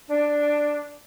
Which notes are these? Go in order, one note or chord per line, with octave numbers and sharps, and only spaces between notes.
D4